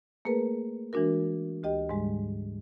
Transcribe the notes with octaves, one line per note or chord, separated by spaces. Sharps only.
A3 A#3 G#4 A#4 B4
E3 G#3 D4 F#4 A#4
D2 G4 D#5 G5
G#2 D3 G3 G#3